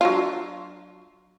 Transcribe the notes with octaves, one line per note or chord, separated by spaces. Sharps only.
F#3 D4 F4